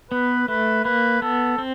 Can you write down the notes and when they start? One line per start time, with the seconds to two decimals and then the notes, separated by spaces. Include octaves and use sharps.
0.11 B3 B4
0.48 A3 B4
0.85 A#3 B4
1.22 B3 A4
1.58 C4